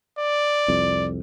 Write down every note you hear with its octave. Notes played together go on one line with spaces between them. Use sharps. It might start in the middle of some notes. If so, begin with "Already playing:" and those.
D5
C2 F2